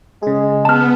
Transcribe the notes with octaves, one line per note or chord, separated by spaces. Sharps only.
C#3 G#3 G#4
B3 A5 F6